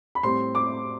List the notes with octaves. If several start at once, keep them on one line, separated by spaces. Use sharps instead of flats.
B5
A2 G3 C4 C6
D6